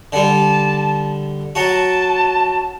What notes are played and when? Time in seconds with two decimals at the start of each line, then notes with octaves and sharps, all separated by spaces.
0.12 D3 G3 A5
1.55 F#3 F#4 A5